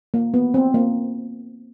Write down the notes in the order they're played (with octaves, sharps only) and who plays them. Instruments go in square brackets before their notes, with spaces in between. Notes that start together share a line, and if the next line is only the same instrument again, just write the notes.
[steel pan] A#3
B3
C4
A#3